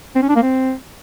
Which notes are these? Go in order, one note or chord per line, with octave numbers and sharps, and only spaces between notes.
C4
C#4
D4
A#3
C4